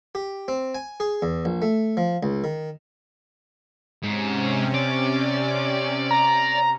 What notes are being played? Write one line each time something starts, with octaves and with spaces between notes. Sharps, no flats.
G4
C4
G#5
G#4
E2
A#1
A3
F3
C#2
D#3
G#2 C3 C#4
D5
A#5